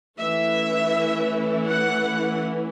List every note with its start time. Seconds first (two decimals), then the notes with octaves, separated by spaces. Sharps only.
0.19 E3 A3 C#4 E4 E5
1.68 F#5